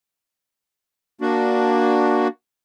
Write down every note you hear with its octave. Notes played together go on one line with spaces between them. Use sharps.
A#3 D4 F#4